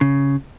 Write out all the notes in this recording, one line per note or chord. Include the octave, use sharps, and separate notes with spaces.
C#3